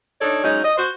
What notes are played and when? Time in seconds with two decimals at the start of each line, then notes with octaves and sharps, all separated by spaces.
0.21 D4 D#4 A4 C#5 D5
0.44 F#3 G#3 C#4 D#4
0.64 D#5
0.77 F#4 C5